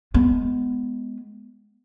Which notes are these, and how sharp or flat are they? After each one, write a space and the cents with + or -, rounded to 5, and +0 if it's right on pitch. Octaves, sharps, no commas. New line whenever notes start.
G#3 +10 B3 +10